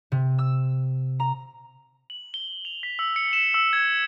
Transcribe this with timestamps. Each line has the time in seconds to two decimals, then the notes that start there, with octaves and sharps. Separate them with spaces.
0.12 C3
0.38 E6
1.20 A#5
2.10 F#7
2.34 G7
2.65 F7
2.83 B6
2.99 E6
3.16 C#7
3.33 E7
3.54 E6
3.73 G#6